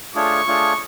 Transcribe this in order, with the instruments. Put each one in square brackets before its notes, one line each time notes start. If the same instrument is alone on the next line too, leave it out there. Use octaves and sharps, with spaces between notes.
[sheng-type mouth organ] A3 D4 F4 G#4 C#5 [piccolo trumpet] C#6
[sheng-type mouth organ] A3 D4 F4 G#4 C#5